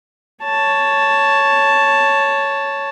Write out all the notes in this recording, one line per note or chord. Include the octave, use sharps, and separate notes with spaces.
C#5 A5